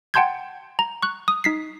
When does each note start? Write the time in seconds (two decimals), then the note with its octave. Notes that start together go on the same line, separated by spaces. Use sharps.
0.14 F#5 G5 A5 C6 G6 G#6
0.79 A#5
1.03 C#6 F#6
1.28 D#6
1.44 D#4 B6 C7